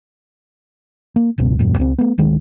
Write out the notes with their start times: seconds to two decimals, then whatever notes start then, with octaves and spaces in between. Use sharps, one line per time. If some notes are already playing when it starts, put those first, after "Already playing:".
1.16 A#3
1.38 F#1 C#2 B2
1.59 D#1 F#2 A#2
1.78 C#2 A#3 C4
1.98 A3 B3
2.18 D1 D#3 G#3